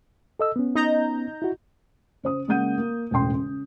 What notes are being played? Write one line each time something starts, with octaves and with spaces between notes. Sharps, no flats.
A4 D#5 E6
B3 C#4
D#4 A#5 G6
E4 F#4
C#3 C5 D#6
C#3 G#3 A#3 F#5 G6 D#7
A#3
E1 A2 C#3 G5 C6
C#3